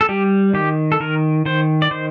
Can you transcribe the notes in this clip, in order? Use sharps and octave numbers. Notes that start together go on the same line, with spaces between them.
A4
G3 G4
D#3 G4
A4
D#3 A#4
D#3 C5
D5
D#3 C5